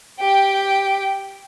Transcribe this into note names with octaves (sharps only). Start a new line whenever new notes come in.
G4 G5